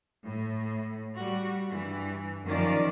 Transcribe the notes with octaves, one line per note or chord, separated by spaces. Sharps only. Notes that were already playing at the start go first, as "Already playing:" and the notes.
A2
G3 F#4
G2 E3
F#2 D#3 F3 D5